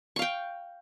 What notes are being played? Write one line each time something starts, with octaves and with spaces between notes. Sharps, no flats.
F5 G5 C#6